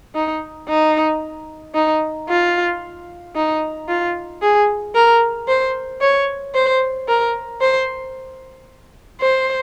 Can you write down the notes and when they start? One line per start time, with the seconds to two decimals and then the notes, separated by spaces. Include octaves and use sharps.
0.15 D#4
0.69 D#4
1.75 D#4
2.29 F4
3.36 D#4
3.88 F4
4.42 G#4
4.95 A#4
5.48 C5
6.01 C#5
6.55 C5
7.08 A#4
7.61 C5
9.21 C5